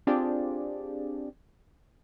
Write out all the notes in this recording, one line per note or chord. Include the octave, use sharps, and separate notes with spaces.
C4 D4 F4 G4 G#4 D5